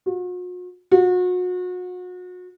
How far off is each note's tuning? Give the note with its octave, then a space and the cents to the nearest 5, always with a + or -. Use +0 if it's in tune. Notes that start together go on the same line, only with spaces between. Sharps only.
F#4 -45
F#4 -35